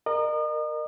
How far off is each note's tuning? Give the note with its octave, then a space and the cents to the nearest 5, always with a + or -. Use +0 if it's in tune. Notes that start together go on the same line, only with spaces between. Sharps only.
A#4 +0 D#5 -40